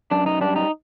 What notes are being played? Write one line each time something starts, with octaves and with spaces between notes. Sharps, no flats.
F#2 D4
D#4
G3 D4
D#4